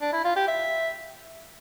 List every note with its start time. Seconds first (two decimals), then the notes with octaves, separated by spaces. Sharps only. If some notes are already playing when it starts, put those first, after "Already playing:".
0.01 D4
0.13 E4
0.25 F4
0.36 G4
0.48 E5